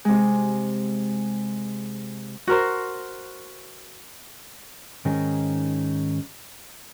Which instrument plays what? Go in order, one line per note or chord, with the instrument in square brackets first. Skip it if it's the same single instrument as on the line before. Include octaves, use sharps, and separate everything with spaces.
[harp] C3 G#3
[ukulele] F#4 A#4 C5
[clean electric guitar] G#2 D#3 C#4 D#4 G#4 A#4